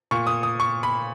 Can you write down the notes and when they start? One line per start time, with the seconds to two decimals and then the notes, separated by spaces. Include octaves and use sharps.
0.11 A#2 C#6
0.27 D#6
0.43 D#6
0.60 C#6
0.83 B5